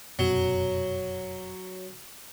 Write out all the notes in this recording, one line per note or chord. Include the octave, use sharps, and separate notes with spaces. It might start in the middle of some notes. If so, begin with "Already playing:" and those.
F1 F#2 B2 F#3